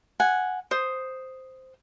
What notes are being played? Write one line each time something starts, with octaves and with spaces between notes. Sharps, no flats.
F#5 G#5
C5 D#6